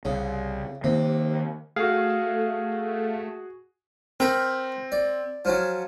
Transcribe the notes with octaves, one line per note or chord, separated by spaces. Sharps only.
C2 C#3
C3 D#3 A#3
A3 F#4 G#4 F5
C4 A#4 G5 B5
D5
F3 F#3 C#4